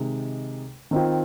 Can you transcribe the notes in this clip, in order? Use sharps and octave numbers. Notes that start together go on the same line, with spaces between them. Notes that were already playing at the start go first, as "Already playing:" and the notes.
Already playing: C3 D#3 G#3 D#4
D#3 C4 F4